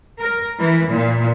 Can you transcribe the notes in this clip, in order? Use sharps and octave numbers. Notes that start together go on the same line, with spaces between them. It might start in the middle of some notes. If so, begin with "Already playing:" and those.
A#4
E3
A#2